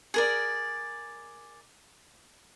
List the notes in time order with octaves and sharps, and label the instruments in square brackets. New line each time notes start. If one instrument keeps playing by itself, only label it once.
[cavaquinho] G#4 A#4 D5